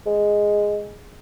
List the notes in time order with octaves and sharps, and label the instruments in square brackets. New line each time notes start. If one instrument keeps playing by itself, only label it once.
[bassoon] G#3